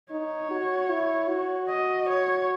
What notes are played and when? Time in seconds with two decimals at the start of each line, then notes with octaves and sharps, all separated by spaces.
0.11 D#4 C#5
0.51 F#4
0.91 E4
1.30 F#4
1.69 D#5
2.09 C#5